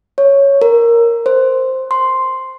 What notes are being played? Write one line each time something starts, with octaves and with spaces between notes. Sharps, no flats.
C#5
A#4
C5
C6